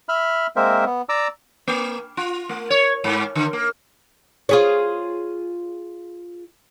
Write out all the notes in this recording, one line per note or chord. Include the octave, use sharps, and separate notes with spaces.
E5 B5 F6
G#3 A#3 C4 A#4 C5 E5
B3
D5 A#5 D6 E6
A#3
F4
A3
C#5
G#2
D3
A#3
F4 G#4 C#5